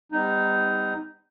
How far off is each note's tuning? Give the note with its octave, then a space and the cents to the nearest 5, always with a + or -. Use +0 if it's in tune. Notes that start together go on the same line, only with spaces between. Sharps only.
G3 +30 B3 +40 D#4 +0